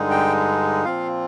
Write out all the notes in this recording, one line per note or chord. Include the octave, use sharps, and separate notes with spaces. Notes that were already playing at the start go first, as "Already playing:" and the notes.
Already playing: G2 D3 G#3 D#4
G5
A#2 F3 C4 F4 F5